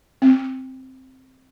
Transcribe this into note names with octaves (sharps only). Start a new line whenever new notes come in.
C4